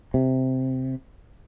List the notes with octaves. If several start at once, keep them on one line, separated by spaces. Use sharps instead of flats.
C3